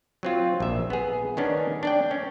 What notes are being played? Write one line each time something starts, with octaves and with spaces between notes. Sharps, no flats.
F#3 C4 F4
A#1 E5
B3 G#4
D#3 B3 C#4 D4
D4 D5 G5
C#4